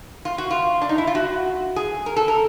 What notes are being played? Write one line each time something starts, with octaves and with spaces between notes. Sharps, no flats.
F4
F#4
F4
D4
D#4
E4
F4
F#4
G#4
A#4
A4
A#4